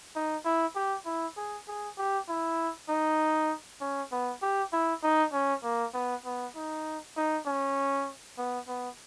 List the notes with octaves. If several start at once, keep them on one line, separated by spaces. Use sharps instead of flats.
D#4
E4
G4
E4
G#4
G#4
G4
E4
D#4
C#4
B3
G4
E4
D#4
C#4
A#3
B3
B3
D#4
D#4
C#4
B3
B3